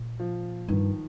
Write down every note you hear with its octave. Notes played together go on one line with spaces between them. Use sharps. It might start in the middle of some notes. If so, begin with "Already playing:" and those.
Already playing: A#2
F3
G2 D#3